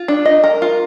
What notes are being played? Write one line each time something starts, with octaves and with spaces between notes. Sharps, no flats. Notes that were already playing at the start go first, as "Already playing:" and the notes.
Already playing: F4
D4
D#5
A#4
F4